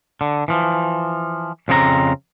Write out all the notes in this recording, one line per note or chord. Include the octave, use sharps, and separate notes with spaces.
D3
E3 F3
F2 C#3 C4 A4 A#5